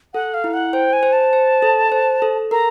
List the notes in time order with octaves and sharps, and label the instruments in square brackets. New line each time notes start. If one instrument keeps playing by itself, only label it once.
[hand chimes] A4 [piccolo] F#5
[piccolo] F5
[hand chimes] E4
[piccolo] F#5
[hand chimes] C5 [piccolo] G5
[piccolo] G#5
[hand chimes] C5
[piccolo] A5
[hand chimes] C5
A4
C5
A4
[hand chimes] A#4 [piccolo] A#5